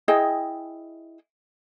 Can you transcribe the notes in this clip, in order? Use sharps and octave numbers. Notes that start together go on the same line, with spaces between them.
E4 G#4 D#5 G5